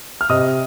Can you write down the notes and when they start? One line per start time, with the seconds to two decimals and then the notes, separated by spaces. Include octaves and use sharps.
0.21 F6
0.29 C3 D#5 D#6